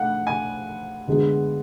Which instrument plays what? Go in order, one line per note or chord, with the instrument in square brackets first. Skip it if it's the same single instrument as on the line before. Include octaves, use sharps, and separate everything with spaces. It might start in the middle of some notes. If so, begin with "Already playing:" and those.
Already playing: [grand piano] A3 D4 [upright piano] F#5
[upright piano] G#5
[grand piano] D3 G#3 B3